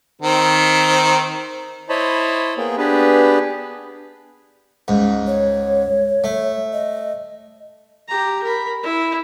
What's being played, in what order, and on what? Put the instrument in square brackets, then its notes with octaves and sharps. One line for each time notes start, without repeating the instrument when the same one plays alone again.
[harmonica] D#3 C4
[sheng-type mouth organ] E4 C5 C#5 D#5 A5 B5
A#3 B3 G#4 G5
B3 D4 G4 G#4 B4
[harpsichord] C#2 G#2
[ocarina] C#5
[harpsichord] A3
[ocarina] D#5
[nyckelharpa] G4 A#5
A#4 B5
E4